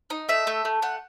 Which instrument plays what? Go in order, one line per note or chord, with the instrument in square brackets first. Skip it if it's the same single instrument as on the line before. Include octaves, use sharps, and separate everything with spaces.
[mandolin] D#4
A3 E5
A3
A3
A3 F#5